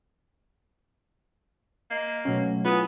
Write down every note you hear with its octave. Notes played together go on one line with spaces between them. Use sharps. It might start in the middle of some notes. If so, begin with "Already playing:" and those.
A#3 D#5
B2 F#3 A3 C#4
B3 E4 F4 G#4 D#6